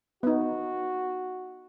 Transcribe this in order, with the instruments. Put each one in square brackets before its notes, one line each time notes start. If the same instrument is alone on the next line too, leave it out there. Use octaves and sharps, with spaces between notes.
[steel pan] B3 D#4 [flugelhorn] F#4